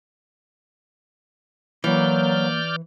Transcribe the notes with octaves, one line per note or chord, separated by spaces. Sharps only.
E3 F#3 A#3 D5 F6 G6